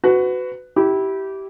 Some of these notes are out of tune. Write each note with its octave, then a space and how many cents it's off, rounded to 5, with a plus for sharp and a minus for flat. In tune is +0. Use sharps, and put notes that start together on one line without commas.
F#4 +0 B4 +25
E4 -15 G4 -20